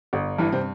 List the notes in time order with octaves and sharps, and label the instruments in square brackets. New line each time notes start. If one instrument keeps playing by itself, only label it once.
[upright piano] G1
[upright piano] G2 [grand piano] E3 E4
[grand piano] C3 C4